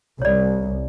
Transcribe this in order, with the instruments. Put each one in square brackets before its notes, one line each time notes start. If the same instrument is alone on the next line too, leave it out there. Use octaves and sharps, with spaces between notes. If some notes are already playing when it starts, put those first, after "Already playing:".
[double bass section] C2 [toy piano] C#5 D5